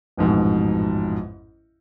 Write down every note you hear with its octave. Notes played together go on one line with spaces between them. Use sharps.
A1 F2 G#2 B2